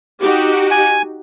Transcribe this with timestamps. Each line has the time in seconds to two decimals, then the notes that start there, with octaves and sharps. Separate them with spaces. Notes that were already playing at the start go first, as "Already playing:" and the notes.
0.21 D#4 F#4 G4
0.71 G#5